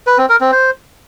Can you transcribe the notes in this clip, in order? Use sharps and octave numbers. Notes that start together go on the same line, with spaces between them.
B4
C4
A#4
C4
C5